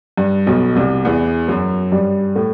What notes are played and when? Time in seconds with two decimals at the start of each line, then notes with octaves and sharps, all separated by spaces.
0.17 G2
0.47 B1 B2
0.75 C2 C3
1.05 E2 E3
1.48 F#2 F#3
1.92 G2 G3
2.35 A2 A3